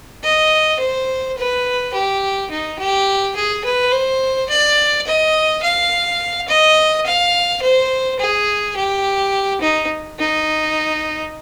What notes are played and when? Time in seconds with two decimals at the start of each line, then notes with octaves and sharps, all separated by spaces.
0.24 D#5
0.79 C5
1.37 B4
1.93 G4
2.50 D#4
2.79 G4
3.36 G#4
3.65 B4
3.92 C5
4.49 D5
5.06 D#5
5.63 F5
6.49 D#5
7.06 F5
7.62 C5
8.19 G#4
8.76 G4
9.61 D#4
10.19 D#4